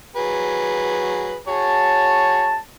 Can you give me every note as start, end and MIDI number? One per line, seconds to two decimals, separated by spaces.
0.16 1.38 54
0.16 1.38 68
0.16 1.38 71
1.47 2.56 66
1.47 2.56 68
1.47 2.56 73
1.47 2.60 81